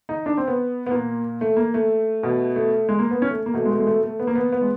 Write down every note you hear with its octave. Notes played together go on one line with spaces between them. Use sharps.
D#4
D4
C4
B3
B3
A#2 A#3
A3
A#3
A3
B2
A3
G#3
A#3
B3
C#4
A3
A#3
B2 A3
G#3
A3
G#3
A3
A3
B3
A#3
B3
B3
G#3